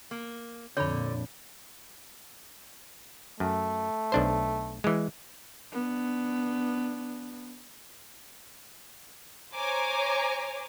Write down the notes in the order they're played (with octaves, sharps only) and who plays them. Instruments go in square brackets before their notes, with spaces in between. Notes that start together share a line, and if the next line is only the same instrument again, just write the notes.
[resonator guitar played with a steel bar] A#3
[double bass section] F2 A#2 [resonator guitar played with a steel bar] D3 [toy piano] C#5 B5
[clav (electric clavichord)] F#2 [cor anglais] A3
[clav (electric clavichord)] B1 D4 C5
E3 G#3
[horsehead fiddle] B3 D4
[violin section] C5 C#5 G#5 A#5 D6